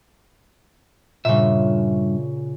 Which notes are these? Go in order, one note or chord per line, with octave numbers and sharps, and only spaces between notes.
G2 A#2 C#3 E5